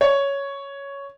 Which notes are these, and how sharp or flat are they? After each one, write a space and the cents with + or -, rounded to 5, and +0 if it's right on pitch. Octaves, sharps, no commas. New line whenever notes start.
C#5 +5